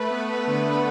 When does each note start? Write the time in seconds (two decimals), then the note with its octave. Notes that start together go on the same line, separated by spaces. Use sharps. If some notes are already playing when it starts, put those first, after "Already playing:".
Already playing: A3 B4
0.11 B3
0.30 B3
0.47 D3
0.66 B3